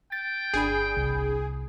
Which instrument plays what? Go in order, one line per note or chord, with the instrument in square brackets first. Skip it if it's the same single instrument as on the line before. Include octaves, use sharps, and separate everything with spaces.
[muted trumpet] G5 [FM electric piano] A6
[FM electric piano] G1 D4 B5 [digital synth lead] G#4
[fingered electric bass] C2